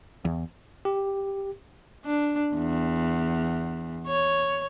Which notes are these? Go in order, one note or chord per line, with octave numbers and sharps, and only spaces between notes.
E2
G4
D4
E2
C#5